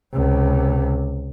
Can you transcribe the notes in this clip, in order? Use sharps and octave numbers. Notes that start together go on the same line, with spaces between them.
C#2 C3